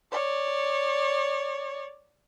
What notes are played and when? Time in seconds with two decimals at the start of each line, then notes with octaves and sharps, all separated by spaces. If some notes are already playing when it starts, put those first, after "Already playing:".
0.12 C#5 D5